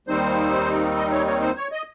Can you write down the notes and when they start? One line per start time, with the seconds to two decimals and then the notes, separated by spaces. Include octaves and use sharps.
0.07 D#2 D#3 G3 C4 D#4 C5
0.97 D#5
1.12 C#5
1.27 C#5
1.41 C5
1.57 C#5
1.72 D#5